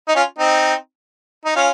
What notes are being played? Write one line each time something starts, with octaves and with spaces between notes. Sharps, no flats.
D#4
C#4 F4
C4 D#4
D#4
C#4 F4